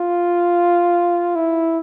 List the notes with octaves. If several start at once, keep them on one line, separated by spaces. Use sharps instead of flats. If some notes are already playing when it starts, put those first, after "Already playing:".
Already playing: F4
E4